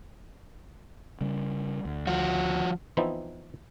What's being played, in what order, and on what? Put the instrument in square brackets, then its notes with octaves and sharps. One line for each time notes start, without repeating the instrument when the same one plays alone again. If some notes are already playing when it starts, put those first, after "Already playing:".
[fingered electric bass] C#3 G3
D2
[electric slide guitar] F3 F#4
[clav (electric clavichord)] E3 F3 B3 C4 D#4 E4